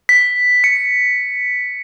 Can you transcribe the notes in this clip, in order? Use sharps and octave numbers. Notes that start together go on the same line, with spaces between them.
B6
C#7